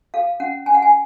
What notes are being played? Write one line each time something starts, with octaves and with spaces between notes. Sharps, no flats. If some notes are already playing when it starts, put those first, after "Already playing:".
A4 F5
C#4 F#5
C#4 G#5
F#5
G#5